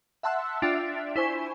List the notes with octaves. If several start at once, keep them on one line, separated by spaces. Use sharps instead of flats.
E5 F#5 A5 C6 E6 F#6
D4 F4 D5 E5 G5
E4 C5 G#5 C#6